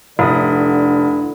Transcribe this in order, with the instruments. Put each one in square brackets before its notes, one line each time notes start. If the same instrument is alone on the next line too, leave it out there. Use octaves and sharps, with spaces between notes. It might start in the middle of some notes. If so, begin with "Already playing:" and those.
[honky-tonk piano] F1 [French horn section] D3 D5 [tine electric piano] E4 B5 D#6